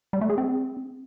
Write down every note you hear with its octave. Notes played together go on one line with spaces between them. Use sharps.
G3
A3
G#4
C4